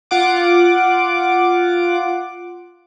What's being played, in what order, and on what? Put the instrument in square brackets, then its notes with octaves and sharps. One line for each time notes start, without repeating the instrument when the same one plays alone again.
[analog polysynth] F4 F#5 D6